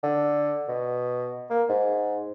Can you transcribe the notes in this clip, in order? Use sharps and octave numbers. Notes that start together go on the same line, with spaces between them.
D3
B2
A#3
G#2